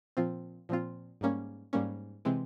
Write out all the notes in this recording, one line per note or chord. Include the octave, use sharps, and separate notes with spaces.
A#2 F3 C4 F4
A#2 F3 C4 F4
G#2 G3 A#3 C#4
G#2 G3 A#3 C#4
C3 E3 G#3 C4